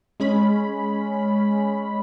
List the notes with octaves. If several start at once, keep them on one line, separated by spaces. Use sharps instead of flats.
G#3 C#4 B5